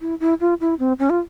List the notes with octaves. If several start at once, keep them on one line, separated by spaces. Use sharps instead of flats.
E4
E4
F4
E4
C4
C#4
F4